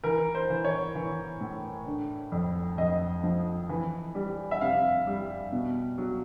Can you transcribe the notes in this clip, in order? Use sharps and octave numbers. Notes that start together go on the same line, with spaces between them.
E3 A#4
C5
E3
C#5
E3
A2
D3
F2
F2 D#5
F3
E3
G3
E5
C3 F5
G3
B2
F#3